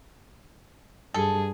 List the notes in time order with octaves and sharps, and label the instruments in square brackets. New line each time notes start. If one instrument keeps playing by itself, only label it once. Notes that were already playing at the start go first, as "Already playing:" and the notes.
[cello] G2 G#4 [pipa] A4